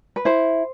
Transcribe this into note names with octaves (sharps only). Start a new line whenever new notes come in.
B4
E4 C5